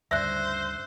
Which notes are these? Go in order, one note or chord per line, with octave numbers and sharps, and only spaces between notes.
D2 G2 C#3 C5 D5 E5 E6 F#6